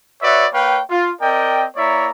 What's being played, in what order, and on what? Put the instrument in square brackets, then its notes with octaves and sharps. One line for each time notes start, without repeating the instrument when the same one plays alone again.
[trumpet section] F#4 B4 C#5 D5 E5
A#3 B4 C#5 F5 G5
F4
C4 A#4 D5 D#5 G5
A#3 E4 C#5 D5 E5 A#5